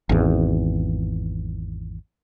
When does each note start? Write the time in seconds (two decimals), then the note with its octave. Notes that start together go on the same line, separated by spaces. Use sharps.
0.09 G#1 E2